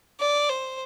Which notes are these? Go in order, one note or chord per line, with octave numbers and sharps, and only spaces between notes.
D5
C5